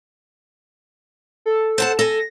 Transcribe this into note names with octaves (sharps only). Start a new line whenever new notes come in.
A4
C5 F#5 A5
A4 G#5 A#6